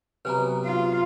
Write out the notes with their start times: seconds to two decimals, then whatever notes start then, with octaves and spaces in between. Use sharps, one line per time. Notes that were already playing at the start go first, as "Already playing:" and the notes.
0.25 C3 F#3 B3 B4 G#5 A#5
0.65 F4